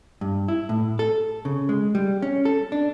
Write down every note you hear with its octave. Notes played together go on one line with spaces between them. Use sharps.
G2
E4
A2
A4
C#3
G#3
G3
C#4
A4
D4